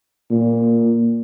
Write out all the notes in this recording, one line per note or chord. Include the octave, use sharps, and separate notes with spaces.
A#2